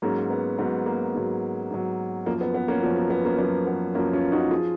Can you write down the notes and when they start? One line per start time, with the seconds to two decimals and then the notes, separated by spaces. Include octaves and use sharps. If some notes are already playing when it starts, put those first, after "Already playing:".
0.02 G#2 F#3 A#3 C#4
0.30 B3
0.58 G#2 F#3 B3
0.86 A#3
1.14 G#2 F#3
1.70 G#2 F#3
2.26 F#2 F3 A#3
2.41 B3
2.54 B3
2.68 A#3 C#4
2.83 F3 B3
2.86 F#2
2.97 A#3
3.10 B3
3.25 A#3 C#4
3.38 F#2 A#3
3.43 F3
3.67 B3
3.95 F#2 F3 A#3 C#4
4.13 C#4 F4
4.32 D#4 F#4
4.51 F3 F4 G#4